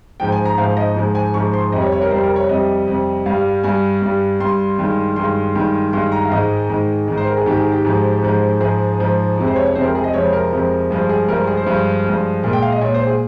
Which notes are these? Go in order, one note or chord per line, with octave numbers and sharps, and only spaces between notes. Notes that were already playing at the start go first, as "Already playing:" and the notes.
G#2 F3 G#3 G5
G#5
A#5
G#2 F3 G#3 F5
D#5
G#2 F3 G#3
G#5
G#2 F3 G#3 C#6
C6
F2 C3 G3 D#5
C#5
C#5
A#4
F2 C3 G3 C5
A#4
C#5
F2 C3 G3 D#5
F2 C3 G3
G2 G3 F5
G2 G3 G#5
G2 G3
G2 G3 C6
G2 D#3 G#3
G2 D#3 G#3 C6
G2 D#3 G#3
G2 D#3 G#3 C6
A#5
F5
G#2 D#3 G#3 D#5
G#2 D#3 G#3
G#2 D#3 G#3
C5
A#4
G#4
G#2 D#3 G#3 G4
G#4
G4
G#2 F3 G#3
G#2 F3 G#3
G#2 F3 G#3 G#4
G#2 F3 G#3
F2 C3 F3 G#3
C5
C#5
C#5
F2 C3 F3 G#3 C5
A#4
G#4
D#5
F2 C3 F3 G#3 C#5
A#4
F2 C3 F3 G#3
G2 F3 G#3
G#4
G2 F3 G#3 A#4
G#4
C5
G2 F3 G#3
G2 F3 G#3
A#2 G#3 A#4
G5
F5
D#5
A#2 G#3 C#5
C5
G#4